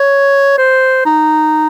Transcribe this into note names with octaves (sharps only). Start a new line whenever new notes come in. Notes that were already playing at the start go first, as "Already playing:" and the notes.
Already playing: C#5
C5
D#4